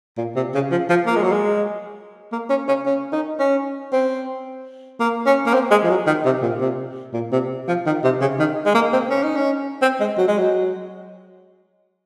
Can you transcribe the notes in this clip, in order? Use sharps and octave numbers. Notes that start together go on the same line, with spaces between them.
A#2
C3
C#3
F3
F3
A#3
G#3
F#3
G#3
A#3
C#4
C#4
C#4
D#4
C#4
C4
A#3
C#4
A#3
C4
G#3
F3
F#3
D#3
C3
A#2
C3
A#2
C3
F3
D#3
C3
C#3
D#3
G#3
A#3
C4
C#4
D#4
C#4
C4
G#3
F#3
G#3
F#3